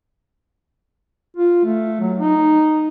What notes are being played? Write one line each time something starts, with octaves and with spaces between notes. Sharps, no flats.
F4
A3
F#3
D#4